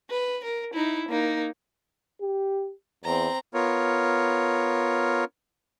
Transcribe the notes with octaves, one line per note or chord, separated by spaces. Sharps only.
B4
A#4
D#4 E4
A#3 D#4
G4
E2 C4 A#5
B3 F4 A#4 C#5